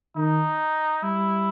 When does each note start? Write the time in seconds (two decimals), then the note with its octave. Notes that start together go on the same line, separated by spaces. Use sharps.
0.16 D#3 D#4
1.03 G3 E4